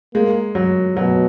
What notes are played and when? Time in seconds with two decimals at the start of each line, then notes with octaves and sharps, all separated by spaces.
0.14 G#3 A#3
0.55 F#3
0.96 B2 F#3